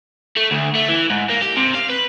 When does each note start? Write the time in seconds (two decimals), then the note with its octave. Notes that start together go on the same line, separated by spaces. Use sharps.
0.36 A3
0.51 D2
0.75 A3
0.89 E3
1.10 G#2
1.29 A#3
1.42 G4
1.57 C3
1.74 F5
1.89 B4